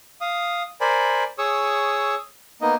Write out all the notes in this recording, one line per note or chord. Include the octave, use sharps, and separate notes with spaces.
F5 D#6
A#4 C5 D5 G#5 B5
G#4 C#5 C#6 D#6 E6
A#3 B3 D#4 D#5